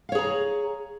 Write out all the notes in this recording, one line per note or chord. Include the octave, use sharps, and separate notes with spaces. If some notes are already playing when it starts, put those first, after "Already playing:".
G#4 C#5 F5 A#5